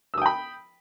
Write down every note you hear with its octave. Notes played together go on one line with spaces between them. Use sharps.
G5 B5 D#6 E6